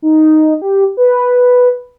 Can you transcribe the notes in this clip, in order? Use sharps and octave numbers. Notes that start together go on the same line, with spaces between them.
D#4
G4
B4